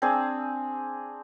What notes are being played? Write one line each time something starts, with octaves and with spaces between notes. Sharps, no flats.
C4 D4 G#4 C5